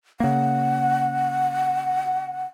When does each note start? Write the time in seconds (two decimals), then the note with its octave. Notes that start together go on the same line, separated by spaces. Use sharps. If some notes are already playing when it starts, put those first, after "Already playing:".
0.20 C#3 A#3 F#5